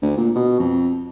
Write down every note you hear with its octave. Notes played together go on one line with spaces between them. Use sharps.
D2
A#2
B2
F2